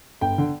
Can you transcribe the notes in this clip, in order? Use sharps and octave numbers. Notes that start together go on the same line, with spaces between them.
G1 G5
D3